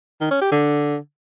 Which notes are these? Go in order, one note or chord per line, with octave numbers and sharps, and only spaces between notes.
D#3
C#4
G4
D3